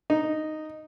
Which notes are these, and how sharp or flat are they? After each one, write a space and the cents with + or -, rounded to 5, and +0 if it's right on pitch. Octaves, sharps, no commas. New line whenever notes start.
D#4 -5